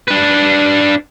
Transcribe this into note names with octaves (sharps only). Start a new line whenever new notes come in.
D4 B4